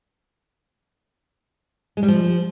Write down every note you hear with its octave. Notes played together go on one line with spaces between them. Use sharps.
G#3
G3
F3